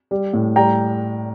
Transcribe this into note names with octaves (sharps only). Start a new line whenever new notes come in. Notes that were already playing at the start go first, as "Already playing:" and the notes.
G3
A2
G3 G5 A#5